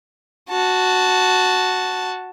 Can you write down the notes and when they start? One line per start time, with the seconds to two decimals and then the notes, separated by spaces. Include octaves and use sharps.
0.49 F#4 A5